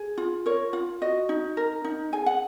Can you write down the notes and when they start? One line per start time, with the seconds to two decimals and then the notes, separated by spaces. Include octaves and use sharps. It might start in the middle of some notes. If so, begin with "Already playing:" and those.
Already playing: G#4
0.18 F4
0.46 A#4 C#5
0.73 F4
1.01 F#4 D#5
1.29 D#4
1.57 A#4
1.84 D#4
2.13 G#4 G#5
2.26 F#5